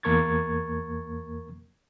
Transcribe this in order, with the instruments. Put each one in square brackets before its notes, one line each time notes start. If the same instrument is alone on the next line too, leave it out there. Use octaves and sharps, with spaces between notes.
[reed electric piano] E2 A#3 A#4 C#6 G#6 A6